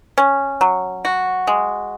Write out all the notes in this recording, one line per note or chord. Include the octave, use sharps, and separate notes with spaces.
C#4
F#3
F#4
G#3